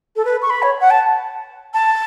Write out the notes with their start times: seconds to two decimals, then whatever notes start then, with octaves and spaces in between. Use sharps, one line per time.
0.16 A4
0.25 B4
0.42 C#6
0.50 B5
0.62 C#5
0.81 F#5
0.90 A5
1.74 A5